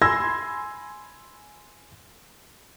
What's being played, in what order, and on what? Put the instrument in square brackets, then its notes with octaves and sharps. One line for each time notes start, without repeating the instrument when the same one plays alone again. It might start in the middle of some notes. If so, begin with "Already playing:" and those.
[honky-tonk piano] G#5 B5 C6 E6 G#6 A#6